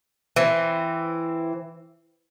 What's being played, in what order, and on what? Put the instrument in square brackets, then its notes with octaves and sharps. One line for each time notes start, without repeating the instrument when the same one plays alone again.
[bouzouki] E3 C4